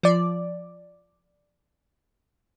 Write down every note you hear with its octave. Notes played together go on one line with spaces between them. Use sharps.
F3 D5